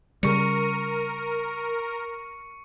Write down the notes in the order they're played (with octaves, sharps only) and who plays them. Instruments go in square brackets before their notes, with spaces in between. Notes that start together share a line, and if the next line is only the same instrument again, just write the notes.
[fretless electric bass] C#3 G3 [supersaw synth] A#4 [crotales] C#6 C#7